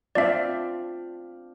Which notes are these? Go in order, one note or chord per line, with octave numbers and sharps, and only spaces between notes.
C4 D4 F4 D5 E5